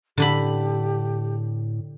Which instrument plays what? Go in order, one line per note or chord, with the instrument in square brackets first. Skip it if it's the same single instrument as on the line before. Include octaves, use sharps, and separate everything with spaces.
[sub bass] A2 [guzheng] D3 D4 B5 [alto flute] G4